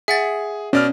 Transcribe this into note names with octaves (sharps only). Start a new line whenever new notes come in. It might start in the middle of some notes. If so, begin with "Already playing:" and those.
G#4 E5 F#5 A6
B2 C#4 D5 F6